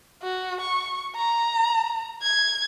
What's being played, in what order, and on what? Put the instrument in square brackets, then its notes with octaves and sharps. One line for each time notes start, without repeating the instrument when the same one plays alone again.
[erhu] F#4
C#6
A#5
G#6